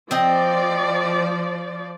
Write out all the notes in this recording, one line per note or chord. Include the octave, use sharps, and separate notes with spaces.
F3 C4 D5 D#5